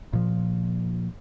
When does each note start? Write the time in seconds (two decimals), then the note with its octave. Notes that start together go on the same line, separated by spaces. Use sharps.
0.13 A#2 F3